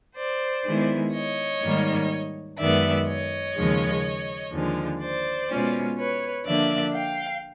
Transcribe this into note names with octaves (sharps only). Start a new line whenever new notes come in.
C5 D5
D#3 G#3 B3 E4
C#5 D#5
G#2 D#3 G3 A#3
F#2 D#3 G#3 B3 D5 E5
C#5 D#5
D#2 C#3 F3 G#3
D#2 D3 F3 G#3
C5 D5
B2 G#3 C#4 F4
B4 C#5
D3 F3 A#3 D4 D5 E5
F5 G5